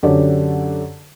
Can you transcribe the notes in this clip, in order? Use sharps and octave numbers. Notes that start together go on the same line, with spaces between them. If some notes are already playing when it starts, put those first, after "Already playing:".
F#2 D3 G4 A4 C#5 D5